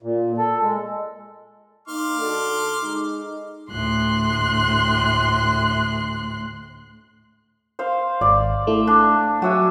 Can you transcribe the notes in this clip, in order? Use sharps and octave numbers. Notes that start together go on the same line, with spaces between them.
A#2
A4
G#3
A#3 D#4 C6 D6 F6
D3 F#4 A4
G#3 D#4
D2 A2 C6 F#6
C5 F5
G#1 D5
A3 E4
D4
F#3 F#4 E5 G#5